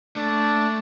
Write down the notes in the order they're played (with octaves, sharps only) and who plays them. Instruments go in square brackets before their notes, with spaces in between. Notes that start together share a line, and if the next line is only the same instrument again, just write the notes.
[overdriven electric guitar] A3 [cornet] D4